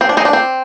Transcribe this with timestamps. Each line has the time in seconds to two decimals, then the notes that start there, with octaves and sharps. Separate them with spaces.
0.01 C4
0.09 D4
0.17 C4 D#4
0.25 D4
0.33 C4